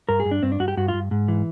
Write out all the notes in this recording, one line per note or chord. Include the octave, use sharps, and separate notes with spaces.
G2 A#4
G#4
G2
D4
G2 C4
D4
G2 F#4
G4
G2 F#4
F4
G2
G#2
E3